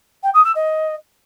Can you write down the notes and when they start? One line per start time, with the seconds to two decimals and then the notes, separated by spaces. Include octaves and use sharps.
0.23 G5
0.34 D#6
0.44 E6
0.55 D#5